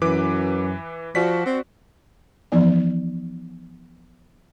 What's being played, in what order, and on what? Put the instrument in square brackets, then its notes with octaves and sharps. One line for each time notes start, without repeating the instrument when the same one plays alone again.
[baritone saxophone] F#2 [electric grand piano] E3 B4 D6
[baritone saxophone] F3 [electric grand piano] F#4 D5 B6
[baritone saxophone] C4
[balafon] E3 F3 B3 D#4 D5